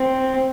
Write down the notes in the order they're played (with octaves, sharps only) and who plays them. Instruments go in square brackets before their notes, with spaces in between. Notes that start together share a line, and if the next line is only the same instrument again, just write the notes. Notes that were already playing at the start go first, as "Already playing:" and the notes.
Already playing: [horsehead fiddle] C4